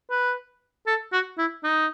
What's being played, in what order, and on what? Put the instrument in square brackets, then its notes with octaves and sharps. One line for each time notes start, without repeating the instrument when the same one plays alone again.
[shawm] B4
A4
F#4
E4
D#4